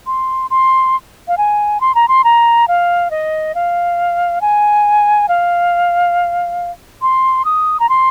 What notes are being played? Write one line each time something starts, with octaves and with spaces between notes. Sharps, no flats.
C6
C6
F5
G#5
C6
A#5
C6
A#5
F5
D#5
F5
G#5
F5
C6
D#6
A#5
C6